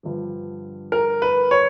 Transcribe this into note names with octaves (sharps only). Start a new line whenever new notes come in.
G2 D3 F3
A#4
B4
C#5